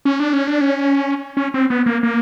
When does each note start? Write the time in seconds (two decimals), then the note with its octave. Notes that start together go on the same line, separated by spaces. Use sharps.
0.05 C#4
0.20 D4
0.33 C#4
0.47 D4
0.61 C#4
1.37 C#4
1.54 C4
1.70 B3
1.86 A#3
2.03 A#3